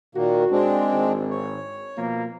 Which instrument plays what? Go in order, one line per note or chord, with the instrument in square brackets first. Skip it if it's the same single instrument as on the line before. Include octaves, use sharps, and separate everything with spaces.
[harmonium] A#2 D#3 A#3 [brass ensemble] F#4
[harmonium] G#3 C4 D4
[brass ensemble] G#1
[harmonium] C#5
[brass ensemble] B2 F3 A#3